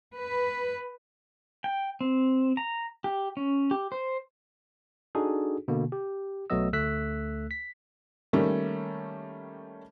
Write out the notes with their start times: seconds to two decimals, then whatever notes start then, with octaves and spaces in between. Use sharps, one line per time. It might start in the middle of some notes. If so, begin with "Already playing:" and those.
0.16 B4
1.64 G5
2.01 C4
2.57 A#5
3.04 G4
3.37 C#4
3.71 G4
3.92 C5
5.15 D4 D#4 F#4 G#4 A4
5.68 B2 D3 A#3
5.92 G4
6.50 B1 F#3 A3 B3 D#5 E6
6.73 D2 A3 E6 F#6 B6
7.51 B6
8.33 D#3 G3 A3 A#3 C#4